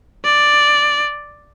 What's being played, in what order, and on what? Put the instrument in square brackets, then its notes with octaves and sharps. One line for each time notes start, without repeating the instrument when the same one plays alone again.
[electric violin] D5